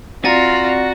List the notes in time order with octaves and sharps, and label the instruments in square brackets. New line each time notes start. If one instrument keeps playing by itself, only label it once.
[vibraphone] C4 D5 [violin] F4 [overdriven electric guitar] F#4 [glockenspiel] A#5 A6 A#6